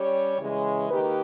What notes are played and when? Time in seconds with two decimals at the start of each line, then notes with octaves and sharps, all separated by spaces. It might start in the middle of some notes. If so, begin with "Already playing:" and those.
Already playing: G3 C#4 G4 C#5
0.39 C#3 E3 G#3
0.90 D#3 A#3 D#4 G4 B4